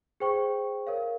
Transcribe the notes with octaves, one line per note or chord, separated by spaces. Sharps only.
G#4 C5 G5 C#6
A#4 C#5 F5